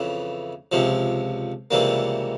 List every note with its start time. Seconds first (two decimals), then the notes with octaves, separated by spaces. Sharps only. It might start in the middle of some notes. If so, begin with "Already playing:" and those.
Already playing: F2 C#3 E3
0.72 C#2 C3 F3
1.71 C#2 C3 E3 G3 A#3